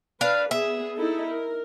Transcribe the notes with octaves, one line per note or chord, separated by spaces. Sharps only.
D4 B4 F5
B3 G#4 E5
D#4 E4 A4
A#4